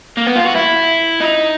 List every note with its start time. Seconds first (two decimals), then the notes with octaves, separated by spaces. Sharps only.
0.17 A#3
0.27 B3
0.36 F4
0.46 F#4
0.55 E4
1.20 D#4